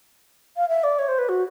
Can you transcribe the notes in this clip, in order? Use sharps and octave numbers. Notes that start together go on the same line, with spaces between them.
F5
E5
D5
C#5
C5
B4
F#4